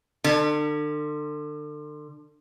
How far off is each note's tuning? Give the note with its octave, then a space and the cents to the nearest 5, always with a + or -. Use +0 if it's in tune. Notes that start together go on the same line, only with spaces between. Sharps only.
D3 +35